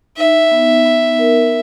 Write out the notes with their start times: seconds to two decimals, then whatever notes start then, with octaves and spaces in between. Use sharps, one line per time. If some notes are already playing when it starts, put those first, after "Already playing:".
0.17 D#4 E5
0.51 B3
0.85 B3
1.19 A#4